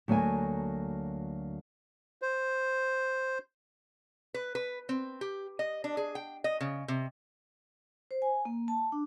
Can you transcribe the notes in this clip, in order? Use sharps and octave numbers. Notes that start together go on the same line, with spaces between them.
D2 F#3 A#3 A4 G#5
C5
B4
B4
C4
G4
D#5
D4
G#4
G5
D#5
C#3
C3
C5
G#5
A#3
A5
D4